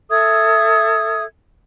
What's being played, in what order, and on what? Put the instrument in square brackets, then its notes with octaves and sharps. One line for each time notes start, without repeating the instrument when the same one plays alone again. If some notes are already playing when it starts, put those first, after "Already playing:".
[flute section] A4 E5 D#6 G#6